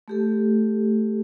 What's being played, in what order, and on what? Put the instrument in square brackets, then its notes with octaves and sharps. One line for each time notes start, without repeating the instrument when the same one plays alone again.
[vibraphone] A3 G4 A4